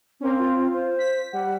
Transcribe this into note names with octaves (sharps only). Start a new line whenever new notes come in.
A#3 C4 C#4
F4
C5
B6
G3 F#5